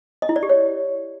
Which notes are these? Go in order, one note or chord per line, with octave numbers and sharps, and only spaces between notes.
D#5
E4
D5
G4
C#5